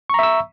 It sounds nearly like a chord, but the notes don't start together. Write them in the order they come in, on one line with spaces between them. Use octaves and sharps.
C#6 A#5 E5 E6